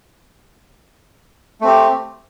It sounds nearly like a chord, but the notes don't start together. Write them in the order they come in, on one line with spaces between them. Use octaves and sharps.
A3 C4 G4